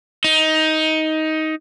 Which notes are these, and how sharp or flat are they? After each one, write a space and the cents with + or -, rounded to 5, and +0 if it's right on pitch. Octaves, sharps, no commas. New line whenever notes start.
D#4 +15